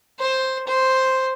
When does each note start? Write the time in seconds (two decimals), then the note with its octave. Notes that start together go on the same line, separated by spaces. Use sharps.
0.19 C5
0.67 C5